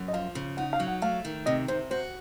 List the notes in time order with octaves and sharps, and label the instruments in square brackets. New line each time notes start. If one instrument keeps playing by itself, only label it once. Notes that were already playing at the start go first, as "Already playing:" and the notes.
Already playing: [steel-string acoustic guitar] F#2
[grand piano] D#5
[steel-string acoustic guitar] F3 [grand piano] F5
[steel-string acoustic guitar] C#3
[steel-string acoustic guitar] D#4 [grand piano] F#5
[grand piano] F5
[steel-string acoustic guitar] F#3
[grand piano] F#5
[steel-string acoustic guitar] A3 [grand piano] F5
[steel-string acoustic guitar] D#3
[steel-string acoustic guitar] C3 [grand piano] D#5
[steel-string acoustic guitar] C3 [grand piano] C5
[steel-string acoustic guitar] F#4 [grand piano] C5